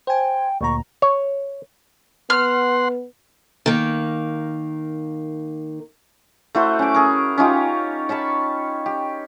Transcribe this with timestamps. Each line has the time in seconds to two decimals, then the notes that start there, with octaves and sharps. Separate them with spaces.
0.07 C5 G5 G#5
0.61 D2 A#2 A#5 C#6
1.02 C#5
2.30 B3 F#5 C6 F6
3.66 D#3 A#3
6.55 A3 E4 F#4 C5
6.79 C#4 D6
6.94 G#4 A#4
7.38 C#4 D#4 F4 G4
8.09 C#5 A5 B5 C#6
8.86 G4